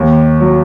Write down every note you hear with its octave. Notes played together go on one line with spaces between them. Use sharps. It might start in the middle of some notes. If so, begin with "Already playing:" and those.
Already playing: D#2
F#3